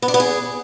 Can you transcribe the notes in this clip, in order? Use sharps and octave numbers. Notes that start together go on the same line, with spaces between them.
B3
D4
B3
G#4